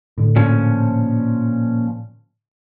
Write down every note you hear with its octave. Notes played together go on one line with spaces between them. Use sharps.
A2 D3
A#2 F3 C#4